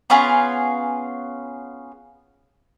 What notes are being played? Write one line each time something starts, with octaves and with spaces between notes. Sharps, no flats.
B3 C#4 F4 G#4